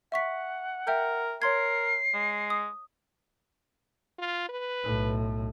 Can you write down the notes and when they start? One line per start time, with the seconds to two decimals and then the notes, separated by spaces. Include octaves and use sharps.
0.12 E5 F#5 C#6 B6
0.87 A#4 E5 G5 G6
1.42 A#4 C#5 C6 G#6 C7
2.14 G#3
2.50 D#6
4.19 F4
4.49 B4
4.84 B1 A2